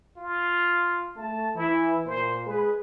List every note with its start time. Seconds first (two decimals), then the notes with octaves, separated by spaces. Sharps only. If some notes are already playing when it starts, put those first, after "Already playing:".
0.17 F4
1.17 A3 A5
1.56 E3 E4
2.06 A#2 C5
2.47 G#3 G#4 B4